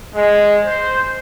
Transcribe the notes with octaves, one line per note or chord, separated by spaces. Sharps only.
G#3
C5